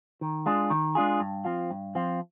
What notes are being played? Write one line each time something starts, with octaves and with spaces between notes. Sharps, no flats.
D#3
G#3 D4 F4 G#4
D#3
G#3 D4 F4 G#4
G2
F3 C4 F4
G2
F3 C4 F4